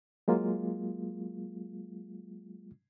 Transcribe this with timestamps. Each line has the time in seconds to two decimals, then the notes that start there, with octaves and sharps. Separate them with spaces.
0.28 F#3 G#3 A#3 F4